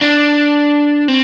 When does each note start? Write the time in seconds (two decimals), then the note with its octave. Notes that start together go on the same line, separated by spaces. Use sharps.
0.01 D4
1.08 C4